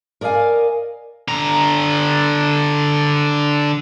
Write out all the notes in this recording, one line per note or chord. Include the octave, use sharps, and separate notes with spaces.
A#4 D5 D#5 F5 G#5
D3 A#5